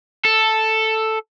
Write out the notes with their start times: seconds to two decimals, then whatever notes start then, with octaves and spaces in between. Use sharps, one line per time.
0.25 A4